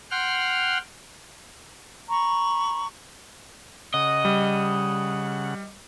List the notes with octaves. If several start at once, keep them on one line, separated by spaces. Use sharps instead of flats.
F#5 G5 C6 F6
A#5 B5 C#6
C#3 D#5 F#5
G3